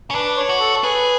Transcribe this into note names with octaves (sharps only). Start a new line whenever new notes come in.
C#4
D4 B4
C#5
F#4
A4
A4
G#4 B4